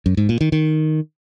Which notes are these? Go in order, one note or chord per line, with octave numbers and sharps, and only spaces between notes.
F#2
G#2
A#2
D#3
D#3